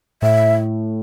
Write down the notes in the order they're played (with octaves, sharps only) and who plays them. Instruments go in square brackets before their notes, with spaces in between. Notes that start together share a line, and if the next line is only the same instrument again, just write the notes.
[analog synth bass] A2 [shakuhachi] E5